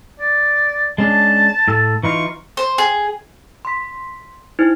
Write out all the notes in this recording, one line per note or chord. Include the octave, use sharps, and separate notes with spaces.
D5
G#3 C#4 D4 A5
A2 A4
E3 D#4 F4 C#6
C5
G#4
C6 B6
D#4 E4 C5